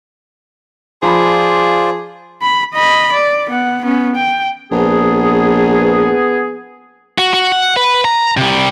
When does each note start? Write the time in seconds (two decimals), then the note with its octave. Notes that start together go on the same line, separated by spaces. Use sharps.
1.03 F3 F4 G#4 C5 D5 B5
2.42 B5
2.74 D#5 B5
3.12 D5
3.50 B3 F#5
3.82 B3 C#4
4.15 G5
4.71 A#1 B3 G#4
7.18 F#4
7.33 F#4
7.52 F#5
7.76 B4
8.05 A#5
8.37 C3 G3